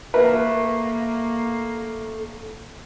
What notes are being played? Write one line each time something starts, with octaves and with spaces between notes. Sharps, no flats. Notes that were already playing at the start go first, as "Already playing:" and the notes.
A3 A#3 A#4 B4